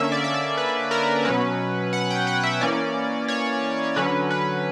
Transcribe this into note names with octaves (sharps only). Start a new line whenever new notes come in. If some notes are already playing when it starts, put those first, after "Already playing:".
Already playing: D3 A#3 C#4 E5
D5
E5
D5
B4
A#4
B2 F#3 C#4 B4
F#5
G5
F#5
E5
E3 A#3 C#4 D5
C#5
D3 F#3 C#4 B4
B4